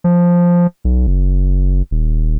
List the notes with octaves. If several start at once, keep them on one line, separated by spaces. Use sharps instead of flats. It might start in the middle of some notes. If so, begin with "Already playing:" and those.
F3
B1
F#1
D#1